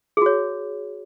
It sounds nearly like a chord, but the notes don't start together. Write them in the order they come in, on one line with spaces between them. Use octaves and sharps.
G#4 F#4 C#5